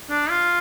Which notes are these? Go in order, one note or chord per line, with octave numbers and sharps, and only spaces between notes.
D4
F4